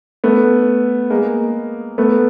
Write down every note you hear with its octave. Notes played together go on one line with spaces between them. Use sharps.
A3 B3
G#3 A#3
A3 B3